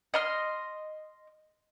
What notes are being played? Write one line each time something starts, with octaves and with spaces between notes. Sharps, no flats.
D#5 C6 F6